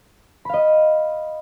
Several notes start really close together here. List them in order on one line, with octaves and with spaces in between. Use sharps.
B5 F5 D#5